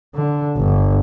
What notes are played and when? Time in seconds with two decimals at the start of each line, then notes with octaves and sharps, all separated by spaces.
0.15 D3
0.56 G1